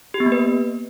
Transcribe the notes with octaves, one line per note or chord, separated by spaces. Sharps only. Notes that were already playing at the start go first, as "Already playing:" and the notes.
G4
B3
A#3
B4